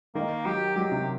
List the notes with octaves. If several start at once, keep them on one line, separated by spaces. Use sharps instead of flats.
D#3 A#3
F#3 G4
F#3 G4
C3